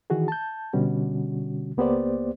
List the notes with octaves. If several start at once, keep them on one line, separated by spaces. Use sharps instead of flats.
D#3 E3 F#4 G#4
A5 G6
B2 D3 G3 C#4 F#4
C#2 A#3 B3 G4 C5 D5